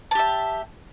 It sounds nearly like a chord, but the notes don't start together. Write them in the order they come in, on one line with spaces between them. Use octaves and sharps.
A5 G4 E5